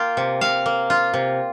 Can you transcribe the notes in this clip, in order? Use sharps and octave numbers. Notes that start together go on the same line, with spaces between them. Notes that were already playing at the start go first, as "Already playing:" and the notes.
Already playing: A#3 F4 G5
C3
C3 F5
A#3
F4
C3